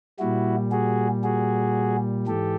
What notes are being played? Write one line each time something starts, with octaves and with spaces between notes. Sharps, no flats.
A#2 G3 E4 F#4
F#4 G#4
F#4 G#4
G#2 E3 G4 A4